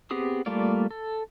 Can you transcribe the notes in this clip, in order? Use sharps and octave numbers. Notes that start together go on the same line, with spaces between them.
B3 C4 G4 G#4 D#6
G3 A3 A#3 F4 D5
A4